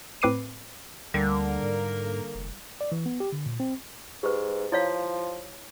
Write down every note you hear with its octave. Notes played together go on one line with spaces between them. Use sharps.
A2 C4 B4 D6 C7 D#7
D2 D3 G3 A#3 A#4
G#2
F1
D5
E3
B3
G4
D3
A#2
C4
G#2 G4 B4
F3 E4 C#5 F5